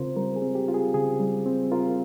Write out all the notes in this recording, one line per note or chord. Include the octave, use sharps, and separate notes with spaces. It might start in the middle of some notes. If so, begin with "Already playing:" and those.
Already playing: C#3 C4 F4 A#4 C5
G3 A#4
G#4
C4
G4
F4
G#4
C#3 G#4
G3
C4
F4 A#4